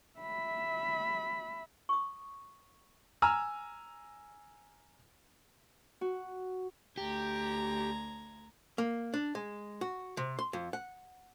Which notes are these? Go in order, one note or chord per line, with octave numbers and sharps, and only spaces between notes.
E5 B5
C#6 D#6
G#5 A#5 E6 F6
F#4
D2 G4 A#5 G#6
A#3
D4
G#3
F#4
C3
C6
F2
F#5